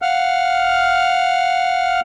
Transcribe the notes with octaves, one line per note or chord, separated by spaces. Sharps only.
F5 F#5 F6